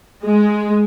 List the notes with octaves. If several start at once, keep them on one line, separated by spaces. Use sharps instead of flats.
G#3